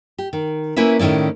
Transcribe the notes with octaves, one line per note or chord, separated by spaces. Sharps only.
G4
D#3
A#3 C#4 E4 B4 E5
A2 D#3 C#4 E4 D5